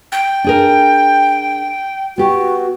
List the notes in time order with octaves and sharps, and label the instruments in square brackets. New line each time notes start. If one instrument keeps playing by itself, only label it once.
[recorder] G5
[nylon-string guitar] D4 G#4 A#4
[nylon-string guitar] B3 G4 [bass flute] F#4